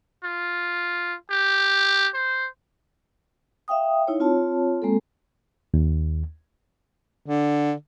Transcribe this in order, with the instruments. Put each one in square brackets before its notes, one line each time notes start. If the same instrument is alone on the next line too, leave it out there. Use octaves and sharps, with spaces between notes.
[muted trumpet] F4
G4
C5
[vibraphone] E5 F5 G5 D#6
D#4 E4 C#5
C4 F4 C#5 A5
G#3 A#3 C4 A4
[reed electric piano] D#2
[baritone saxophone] D3